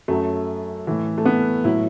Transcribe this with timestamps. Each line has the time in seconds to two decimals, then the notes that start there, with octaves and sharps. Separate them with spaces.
0.08 F#2 F#3 A3
0.87 A2 E3
1.18 A3
1.25 B3
1.64 A2 F#3 E4